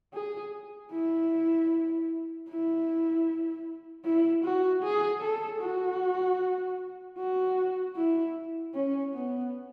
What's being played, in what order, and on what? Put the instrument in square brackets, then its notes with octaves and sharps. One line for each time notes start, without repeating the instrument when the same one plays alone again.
[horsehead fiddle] G#4
E4
E4
E4
F#4
G#4
A4
F#4
F#4
E4
C#4
B3